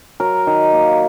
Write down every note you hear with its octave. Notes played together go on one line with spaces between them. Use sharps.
F#3 A#4
D#3
A#3